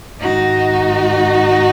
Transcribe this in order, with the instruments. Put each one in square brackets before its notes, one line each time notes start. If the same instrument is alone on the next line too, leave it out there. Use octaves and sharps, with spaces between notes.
[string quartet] G#2 D#3 D#4 F#4